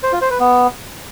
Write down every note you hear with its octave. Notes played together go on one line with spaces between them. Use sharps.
C5
F4
C5
B4
B3